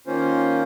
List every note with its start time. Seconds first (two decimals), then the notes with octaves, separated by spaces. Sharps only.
0.07 D#3 A#3 C#4 F4 C5